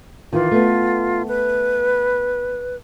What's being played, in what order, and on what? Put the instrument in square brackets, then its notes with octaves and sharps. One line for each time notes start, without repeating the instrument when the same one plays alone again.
[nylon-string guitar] D#3 E3 [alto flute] F4
[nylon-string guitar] A3 B3
[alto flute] B4